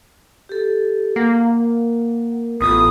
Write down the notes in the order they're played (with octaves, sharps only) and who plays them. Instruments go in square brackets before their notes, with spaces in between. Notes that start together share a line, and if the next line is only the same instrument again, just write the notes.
[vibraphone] G4 A4
[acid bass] A#3 [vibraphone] F#5
[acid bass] A1 [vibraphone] B3 F4 A4 [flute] D#6